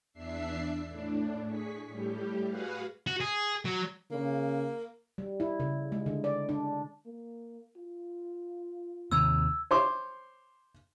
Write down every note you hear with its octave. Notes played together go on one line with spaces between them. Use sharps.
E2 D4 E5 C7
A2 D4
G#4 C#6 B6
A2 G3 G4
F#4 G#4 B4 F5 F#5
F#4
G#4
F#3
C#3 A#3
G3
E4
C#3
G#3
D3
D5
D4
A#3
F4
D#2 C3 D#3 E6 G#6
C5 C#5 C6 D6